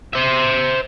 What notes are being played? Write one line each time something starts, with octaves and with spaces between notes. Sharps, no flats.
C5 E5